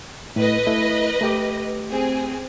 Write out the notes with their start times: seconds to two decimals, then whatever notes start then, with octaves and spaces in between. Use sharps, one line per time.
0.36 A2 B4 D#5
0.67 A3 E4
1.21 A3 G4 D6
1.89 C4 G#4